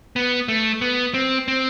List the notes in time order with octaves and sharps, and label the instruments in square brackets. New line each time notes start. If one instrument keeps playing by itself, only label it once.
[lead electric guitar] B3
A3
B3
C4
C4